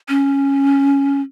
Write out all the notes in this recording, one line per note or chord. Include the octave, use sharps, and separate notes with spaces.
C#4